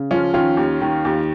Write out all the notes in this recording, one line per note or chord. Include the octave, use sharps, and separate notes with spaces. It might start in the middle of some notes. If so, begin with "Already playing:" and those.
Already playing: C#3
F3 C#4 F4
D#3 C#4 F4
D#2
D#3
D#2